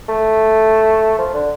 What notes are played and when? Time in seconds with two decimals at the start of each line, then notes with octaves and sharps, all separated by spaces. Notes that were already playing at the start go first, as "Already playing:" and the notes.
0.08 A3
1.18 F3
1.34 D3